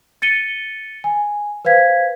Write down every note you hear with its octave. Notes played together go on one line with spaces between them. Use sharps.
A6 C#7 D#7 G7
G#5
B4 C5 F5 G#6 B6